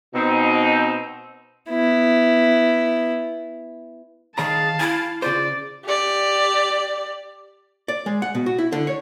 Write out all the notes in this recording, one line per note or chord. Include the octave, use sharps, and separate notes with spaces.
B2 C4 D#4
B3 E4
D#3 G#4 C#5 F5 A5 A#5
E4 G#5
C#3 F4 C5 D5
G4 D5
D5
G#3
F#5
B2
F#4
E4
D3
C#5